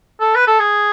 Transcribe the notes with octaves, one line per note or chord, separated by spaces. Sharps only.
A4
B4
A4
G#4